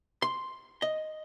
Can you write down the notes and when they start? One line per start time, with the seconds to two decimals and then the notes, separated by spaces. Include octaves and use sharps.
0.22 C6
0.82 D#5